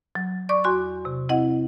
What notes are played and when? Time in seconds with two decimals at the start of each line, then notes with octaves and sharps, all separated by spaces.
0.15 F#3
0.49 D5 C#6 D6
0.64 E2 F#4 C6
1.05 C3
1.29 C4 E4 D#5 F#5